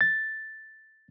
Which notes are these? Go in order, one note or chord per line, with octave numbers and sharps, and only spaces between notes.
A6